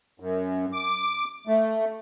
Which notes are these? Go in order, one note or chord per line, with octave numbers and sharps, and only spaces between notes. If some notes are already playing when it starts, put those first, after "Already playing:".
F#2
D6
A3